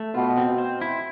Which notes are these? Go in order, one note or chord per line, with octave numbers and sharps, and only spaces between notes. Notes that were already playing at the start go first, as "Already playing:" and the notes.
Already playing: A3
B2 F4
C4
C5
E4